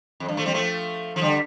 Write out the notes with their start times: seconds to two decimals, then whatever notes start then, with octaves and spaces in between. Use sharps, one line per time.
0.20 F2
0.29 G2
0.37 F3 A3
0.45 G3 C4
0.54 F3 A3
1.16 F3
1.21 D3 G3